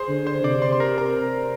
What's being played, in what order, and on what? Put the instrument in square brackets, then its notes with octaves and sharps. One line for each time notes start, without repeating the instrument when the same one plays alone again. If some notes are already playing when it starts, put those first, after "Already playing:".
Already playing: [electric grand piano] G#4 C5 C6
[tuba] D3
[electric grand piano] C5 C6
[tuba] C3 [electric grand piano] D5 D6
[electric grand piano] C5 C6
C6
A#4 A#5
A#4 A#5